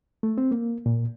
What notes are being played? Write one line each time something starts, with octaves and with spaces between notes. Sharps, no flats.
A3
C4
A#3
A#2